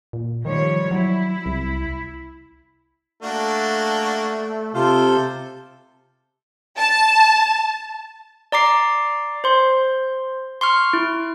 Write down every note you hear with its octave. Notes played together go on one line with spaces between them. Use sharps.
A#2
D#3 F3 G3 C#5
F#3 E4
C2
A3 A#3 D4 F#4
C3 F4 A4 C5
A5
D5 A#5 D6 C7
C5 C6
C6 C#6 F6
E4